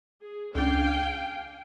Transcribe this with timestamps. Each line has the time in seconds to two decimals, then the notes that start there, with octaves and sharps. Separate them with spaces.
0.21 G#4
0.55 C#2 D4 F5 G5 G#5